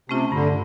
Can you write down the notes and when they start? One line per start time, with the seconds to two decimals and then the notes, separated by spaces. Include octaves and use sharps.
0.09 C3 A3 C#4 F4
0.32 G2 D3